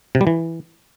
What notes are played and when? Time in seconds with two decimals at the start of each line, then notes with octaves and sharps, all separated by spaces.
0.15 C3
0.21 G3
0.27 E3